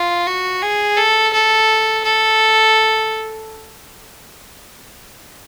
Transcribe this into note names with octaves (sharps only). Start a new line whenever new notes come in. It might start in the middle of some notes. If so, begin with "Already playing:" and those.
Already playing: F4
F#4
G#4
A4
A4
A4